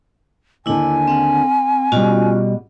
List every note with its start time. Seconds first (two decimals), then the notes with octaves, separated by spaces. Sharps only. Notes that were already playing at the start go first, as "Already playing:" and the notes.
0.66 D#2 D3 D4 E4 G#5
1.07 C4 F#5
1.92 B2 G3 C#4 F4 F#4